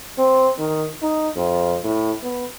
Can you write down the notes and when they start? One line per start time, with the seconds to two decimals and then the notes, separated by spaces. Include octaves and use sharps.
0.18 C4
0.59 D#3
1.02 D#4
1.36 F2
1.84 A2
2.23 B3